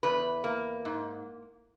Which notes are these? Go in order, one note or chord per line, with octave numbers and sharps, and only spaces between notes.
E2 B4
A#3
G#2